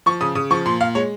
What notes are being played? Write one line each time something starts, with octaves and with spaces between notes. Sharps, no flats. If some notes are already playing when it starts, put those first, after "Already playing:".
F3 C#6
C#3 D#6
C#3 D#6
F3 C#6
A#2 C6
A#2 F5
G#3 C#5